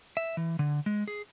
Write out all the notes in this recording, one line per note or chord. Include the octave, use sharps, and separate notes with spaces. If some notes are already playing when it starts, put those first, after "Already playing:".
E5
E3
D3
G#3
G#4